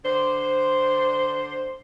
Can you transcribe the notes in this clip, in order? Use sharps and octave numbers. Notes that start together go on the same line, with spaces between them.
D3 D4 C5